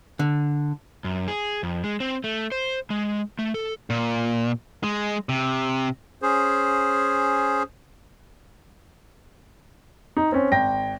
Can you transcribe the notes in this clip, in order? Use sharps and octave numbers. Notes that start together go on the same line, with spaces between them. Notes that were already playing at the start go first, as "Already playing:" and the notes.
D3
F#2
G#4
F2
G#3
C4
A3
C5
G#3
A3
A4
A#2
G#3
C3
C#4 G#4 C5
D#4
C4 C#4
G#1 G5 A#6